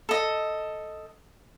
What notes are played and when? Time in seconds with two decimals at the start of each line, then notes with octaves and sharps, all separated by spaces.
0.09 A4 D#5